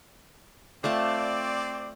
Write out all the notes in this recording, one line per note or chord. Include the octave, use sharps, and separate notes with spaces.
A3 C4 F4 D5 A5